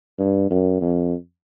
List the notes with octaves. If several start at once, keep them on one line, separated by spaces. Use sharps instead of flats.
G2
F#2
F2